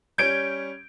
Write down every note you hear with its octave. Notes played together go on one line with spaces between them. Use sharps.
G3 C#4 G6 G#6 D7